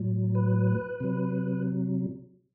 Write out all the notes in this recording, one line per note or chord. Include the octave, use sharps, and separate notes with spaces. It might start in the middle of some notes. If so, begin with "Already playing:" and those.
Already playing: A2 F#3
B4
C3 F#3